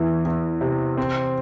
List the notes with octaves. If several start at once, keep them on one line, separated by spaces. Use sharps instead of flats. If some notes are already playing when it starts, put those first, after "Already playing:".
Already playing: E2 E3
E2
C3
C4